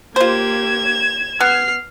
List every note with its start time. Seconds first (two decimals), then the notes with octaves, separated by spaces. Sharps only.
0.16 A#3 F4 G4 C5 G#6 E7
1.40 B3 F6 C7